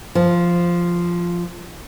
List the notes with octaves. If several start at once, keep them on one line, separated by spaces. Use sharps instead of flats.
F3